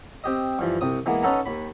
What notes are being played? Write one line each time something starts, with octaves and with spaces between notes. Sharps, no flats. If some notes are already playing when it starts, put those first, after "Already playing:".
C4 G4 D#5
G2 E3 F3
C2 C3 D#6
E3 G#3 A#3 B3
C#4 D#4 A4 B4 F#5 A#5
D#2 B5